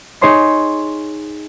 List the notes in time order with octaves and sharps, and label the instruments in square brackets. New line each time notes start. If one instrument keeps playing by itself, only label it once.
[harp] D#4 G#4 C#5 C6 C7